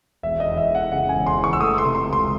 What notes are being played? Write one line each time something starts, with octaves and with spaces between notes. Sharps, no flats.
E1 E5
D#5
E2
E5
E1
F#5
C#3 F#5
G#5
E1
C6
E2
C#6
E6
A3 D#6
C6
C3
C6
C#2
C6